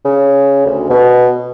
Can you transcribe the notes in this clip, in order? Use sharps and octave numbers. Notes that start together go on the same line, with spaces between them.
C#3
D2
B2